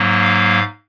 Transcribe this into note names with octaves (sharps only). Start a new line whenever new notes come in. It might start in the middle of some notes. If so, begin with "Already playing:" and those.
Already playing: G#2 F#3 A#3
F5